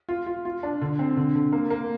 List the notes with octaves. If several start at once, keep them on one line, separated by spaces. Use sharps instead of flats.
F4
F4
F4
D4
D3
C4
D3
D3
A#3
A#3